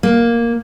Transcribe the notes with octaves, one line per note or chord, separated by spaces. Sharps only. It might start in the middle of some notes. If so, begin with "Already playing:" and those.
A#3